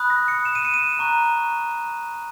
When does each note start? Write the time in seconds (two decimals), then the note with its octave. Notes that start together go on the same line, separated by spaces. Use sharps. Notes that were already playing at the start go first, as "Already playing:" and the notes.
Already playing: B5 D#6 F#6
0.10 A#6
0.28 C#7
0.45 E7
0.55 D#7
0.65 C#7
0.74 D#7
0.99 A#5 C#6 F#6